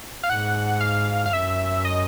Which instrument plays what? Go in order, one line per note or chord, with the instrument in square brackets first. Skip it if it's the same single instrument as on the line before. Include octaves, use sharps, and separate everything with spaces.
[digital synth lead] F5
[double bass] G#2 [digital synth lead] F#5
[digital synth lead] F5
F5
[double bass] F#2 [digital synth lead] E5
[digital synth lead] D#5